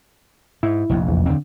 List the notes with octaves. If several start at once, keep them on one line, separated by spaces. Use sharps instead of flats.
G#2 E4
F1 A#1 F2
E2
D3 C4